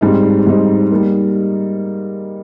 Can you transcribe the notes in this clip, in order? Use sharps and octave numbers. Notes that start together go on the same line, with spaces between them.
G#2 G3 C4 D#4
G#2 G3 C4 D#4
G3 A#3 D#4